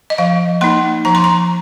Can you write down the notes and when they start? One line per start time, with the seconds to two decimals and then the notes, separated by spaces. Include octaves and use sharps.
0.10 D#5
0.18 F3 F5
0.61 A#3 D#4 C6
1.05 F3 A#5
1.15 C6
1.24 A#5